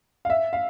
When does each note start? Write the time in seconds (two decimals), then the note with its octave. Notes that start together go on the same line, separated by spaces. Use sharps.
0.25 F5
0.30 E5
0.53 F5